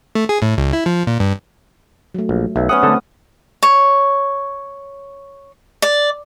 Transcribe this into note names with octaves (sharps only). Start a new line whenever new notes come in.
A3
G#4
A2
C#2
E4
F3
A#2
G2
F#3 A3
A#1
B1 E5
B3 C#4 F#5 D#6
D3 A3 C4 A4
C#5
D5